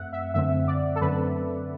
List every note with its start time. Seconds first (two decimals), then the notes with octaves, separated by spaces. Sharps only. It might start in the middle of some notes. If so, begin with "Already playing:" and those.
Already playing: F#2 A3 C4 E5 F#5
0.13 E5
0.34 F#2 D3 A3 C4 E5
0.68 D5
0.96 A4
1.01 F#2 D3 A3 C4 B4